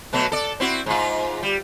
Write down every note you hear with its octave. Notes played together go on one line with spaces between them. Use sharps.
B2 F#3 A3
A4 D5
C4 E4 F#4
G#2 F4
G3